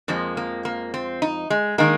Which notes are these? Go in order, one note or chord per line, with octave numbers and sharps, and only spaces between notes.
F2 F3 G#3 A#3
A#3
A#3
C4
D#4
G#3
D#3 G#3 A#3